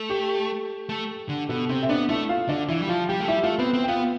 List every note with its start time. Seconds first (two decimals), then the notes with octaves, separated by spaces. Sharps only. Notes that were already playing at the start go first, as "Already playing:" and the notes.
Already playing: A3
0.10 G4
0.89 A3
1.29 D3
1.49 B2 A4
1.69 C3 C4 C5
1.83 E5
1.89 B3 D4 D5
2.09 A3 E4 E5
2.29 F4 F5
2.49 D3 D4 D5
2.68 E3 E4 E5
2.82 G3
2.89 F3 F4 F5
3.08 G3 G4 G5
3.20 A3
3.28 G3 E4 E5
3.43 A3 F4 F5
3.58 B3 C4 B4
3.73 C4
3.84 G5
3.88 B3 F4 F5